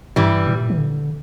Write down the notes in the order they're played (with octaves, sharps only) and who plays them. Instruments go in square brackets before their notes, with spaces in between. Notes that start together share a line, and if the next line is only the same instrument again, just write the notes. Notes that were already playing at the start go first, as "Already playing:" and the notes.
[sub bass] G2 [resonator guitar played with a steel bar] E3 G3
[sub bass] A#2
E3
D3